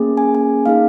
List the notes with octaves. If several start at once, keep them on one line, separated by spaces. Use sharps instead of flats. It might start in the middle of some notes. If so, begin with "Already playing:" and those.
Already playing: A#3 C#4 G#4
G#5
G#5
A#3 D#4 G#4 F5